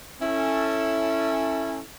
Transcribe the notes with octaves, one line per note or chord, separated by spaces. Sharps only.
C#4 E4 A4